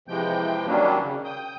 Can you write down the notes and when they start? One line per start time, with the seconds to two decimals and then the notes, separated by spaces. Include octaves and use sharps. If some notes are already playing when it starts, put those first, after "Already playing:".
0.08 C3 E3 F3 G#3 G5 G6
0.66 D#3 F#3 G3 A#3 C#4 D4
1.01 C#3
1.24 G5 D#6 G6